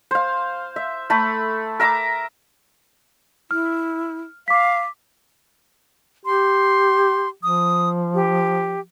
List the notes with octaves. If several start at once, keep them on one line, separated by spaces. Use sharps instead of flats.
C5 F5
E5
A3 A4 B5
A#4 E5 A#5 D6
E4 F6
F5 D6 B6
G4 C6
F3 D#6
G4